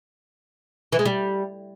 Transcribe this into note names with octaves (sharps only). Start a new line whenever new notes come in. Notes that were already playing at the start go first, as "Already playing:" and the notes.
E3
G#3
G3